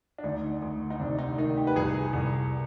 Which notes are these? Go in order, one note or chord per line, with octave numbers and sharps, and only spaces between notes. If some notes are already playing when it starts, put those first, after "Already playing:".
D4
D2 D#4
D2
D#4
C3 D4
D#4
D#3 D#4
G4
B4
C2 G#4
C2